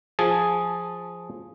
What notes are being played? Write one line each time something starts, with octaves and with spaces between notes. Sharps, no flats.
F3 G#4 A5